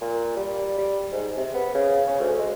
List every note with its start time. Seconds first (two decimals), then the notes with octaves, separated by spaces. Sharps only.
0.01 A#2
0.36 G3
0.78 G3
1.12 G#2
1.37 C3
1.54 B3
1.75 C#3
2.07 C#4
2.20 D2
2.39 G#3